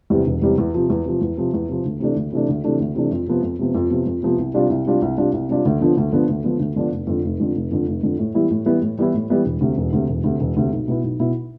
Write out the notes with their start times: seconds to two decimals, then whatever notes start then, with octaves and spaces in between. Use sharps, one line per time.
0.10 E2 C3 G3
0.27 E1
0.42 E2 C3 G3
0.58 E2
0.74 C3 F3
0.90 E2
1.05 C3 F3
1.21 E2
1.37 C3 F3
1.54 E2
1.69 C3 F3
1.85 D2
2.00 C3 E3 A3 D4
2.16 D2
2.33 C3 E3 A3 D4
2.48 D2
2.64 C3 E3 A3 D4
2.79 D2
2.95 C3 E3 A3 D4
3.11 F2
3.27 C3 F3 B3
3.43 F2
3.59 C3 F3 B3
3.75 F2
3.90 C3 F3 B3
4.06 F2
4.23 C3 F3 B3
4.38 C2
4.54 C3 G3 D4 F4
4.69 C2
4.86 C3 G3 D4 F4
5.02 C2
5.18 C3 G3 D4 F4
5.33 C2
5.49 C3 G3 D4 F4
5.65 D2
5.81 D3 F3 B3 D4
5.97 D2
6.12 D3 F3 B3 D4
6.29 D2
6.44 D3 F3 B3 D4
6.59 D2
6.76 D3 F3 B3 D4
6.91 F1
7.07 F2 D3
7.24 F1
7.40 F2 D3
7.55 F1
7.71 F2 D3
7.87 F1
8.03 F2 D3
8.19 A2
8.34 E3 G3 B3 E4
8.51 A2
8.66 E3 G3 B3 E4
8.82 A2
8.98 E3 G3 B3 E4
9.14 A2
9.30 E3 G3 B3 E4
9.46 E1
9.61 D2 C3
9.78 E1
9.93 D2 C3
10.09 E1
10.24 D2 C3
10.40 E1
10.57 D2 C3
10.72 B1
10.88 B2 B3 E4
11.04 B1
11.19 B2 B3 E4